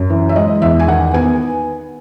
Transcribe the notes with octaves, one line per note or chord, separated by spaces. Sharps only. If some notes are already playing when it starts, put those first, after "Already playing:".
Already playing: F#2
E3
E5
G#3 D#5
E2 E5
G#5
D#3 F#5
B3 G#5